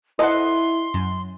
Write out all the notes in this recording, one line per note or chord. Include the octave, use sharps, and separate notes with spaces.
E4 A4 B4 C5 D#5 F#5 C6
F#2